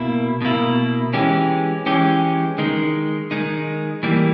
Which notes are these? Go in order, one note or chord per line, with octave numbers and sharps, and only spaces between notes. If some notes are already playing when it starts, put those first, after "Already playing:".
Already playing: B2 A#3 E4
B2 A#3 E4
E3 G#3 C#4 G4
E3 G#3 C#4 G4
D#3 G#3 D#4
D#3 G#3 D#4
E3 G3 A#3